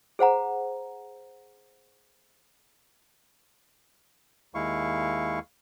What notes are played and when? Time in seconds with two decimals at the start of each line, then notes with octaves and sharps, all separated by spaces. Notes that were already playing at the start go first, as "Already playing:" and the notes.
0.19 G#4 C5 F#5 A#5
4.55 D#2 G#3 E4 F5 C#6